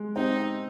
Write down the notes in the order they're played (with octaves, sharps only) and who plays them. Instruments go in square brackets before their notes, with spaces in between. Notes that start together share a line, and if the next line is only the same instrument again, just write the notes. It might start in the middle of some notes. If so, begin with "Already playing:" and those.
Already playing: [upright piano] G#3
[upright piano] C4 [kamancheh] D#4